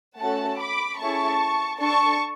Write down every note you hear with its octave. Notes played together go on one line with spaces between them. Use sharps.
A3 C#4 F#4 A4 F#5 A5
B5 D6
A3 C#4 E4 G#4 A5 C#6
D4 A4 A5 C#6